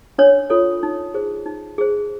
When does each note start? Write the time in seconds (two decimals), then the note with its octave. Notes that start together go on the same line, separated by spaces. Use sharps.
0.18 D4 C#5
0.50 F4 A4 C#5
0.83 D#4
1.14 G#4 C5
1.46 D#4
1.78 G#4 C5